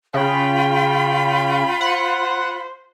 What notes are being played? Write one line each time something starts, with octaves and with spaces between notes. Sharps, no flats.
C#3 F4 G5 B5
C5 F#5